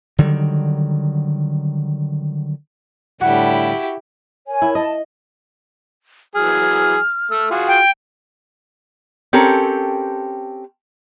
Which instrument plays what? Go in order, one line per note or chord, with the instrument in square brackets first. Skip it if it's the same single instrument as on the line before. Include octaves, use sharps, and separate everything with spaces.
[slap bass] D3 D#3 F#3 G3
[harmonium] A2 D3 G3 [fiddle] E4 G4 [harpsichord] F#4
[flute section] A#4 C#5 G#5
[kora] E4
[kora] D#5 [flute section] A5
[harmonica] E3 F#3 G#4 [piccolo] F6
[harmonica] A3 E6
F4 F#4 G#4
[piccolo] G5
[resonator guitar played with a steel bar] C4 C#4 G4 A4 A#4